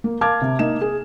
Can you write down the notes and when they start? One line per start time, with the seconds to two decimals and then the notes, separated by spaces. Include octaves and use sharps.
0.04 A#3
0.21 A#4 F5 A5 D6 F6 G#6
0.42 C3
0.59 A#3 D#4 E7
0.81 G#4